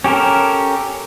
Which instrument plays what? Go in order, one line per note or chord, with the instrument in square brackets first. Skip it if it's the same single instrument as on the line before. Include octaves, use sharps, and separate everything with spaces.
[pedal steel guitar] C#4 G4 A4 A#4